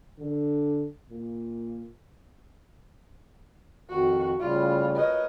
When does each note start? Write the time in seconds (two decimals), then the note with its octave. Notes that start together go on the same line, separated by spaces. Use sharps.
0.19 D3
1.10 A#2
3.89 F2 D#3 F#4
4.40 A2 C#3 G3 F4
4.96 A#4 B4 C#5 D#5